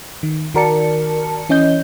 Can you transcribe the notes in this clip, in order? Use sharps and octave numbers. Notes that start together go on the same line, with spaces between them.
D#3
D#3 F#4 A#4 D5 A5 C#7
E3 C#4 D#5 G6